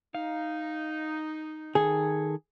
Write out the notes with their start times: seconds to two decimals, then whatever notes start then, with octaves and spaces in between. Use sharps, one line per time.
0.15 D#4 F5
1.75 D#3 G#4 A4 G#5